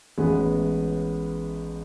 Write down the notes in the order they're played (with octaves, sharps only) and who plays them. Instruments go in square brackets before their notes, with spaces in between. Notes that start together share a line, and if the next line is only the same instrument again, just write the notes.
[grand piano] A1 A2 G#3 B3